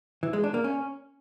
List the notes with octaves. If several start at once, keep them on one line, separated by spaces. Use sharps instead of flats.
E3
G#3
D4
A#3
C#4